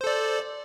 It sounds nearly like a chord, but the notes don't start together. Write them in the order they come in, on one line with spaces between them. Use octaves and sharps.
C5 A4 D5